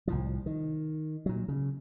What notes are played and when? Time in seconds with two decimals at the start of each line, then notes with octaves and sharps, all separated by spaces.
0.08 C2 A2 F3
0.46 D#3
1.26 A#2 F#3
1.48 C#3